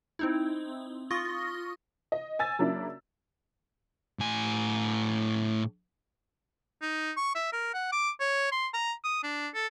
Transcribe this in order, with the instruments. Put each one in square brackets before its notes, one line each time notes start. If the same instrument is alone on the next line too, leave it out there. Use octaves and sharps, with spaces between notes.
[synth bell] C4 D#4 E4
F4 C#6 D#6 A#6 G7
[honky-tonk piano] D#5
G#5 E6 A6
C#3 F#3 A#3 C#4 D4 E4
[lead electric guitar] A2 G#5
[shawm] D#4
C#6
E5
A#4
F#5
D6
C#5
C6
A#5
D#6
D4
A4